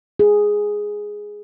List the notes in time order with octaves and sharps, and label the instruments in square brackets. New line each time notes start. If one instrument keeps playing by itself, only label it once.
[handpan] G#4